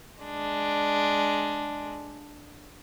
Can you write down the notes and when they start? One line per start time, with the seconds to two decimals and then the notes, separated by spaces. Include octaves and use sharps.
0.21 G#3 D4